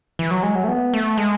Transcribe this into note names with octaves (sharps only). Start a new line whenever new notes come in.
E3
F#3
G#3
F#3
A3
B3
A3
G#3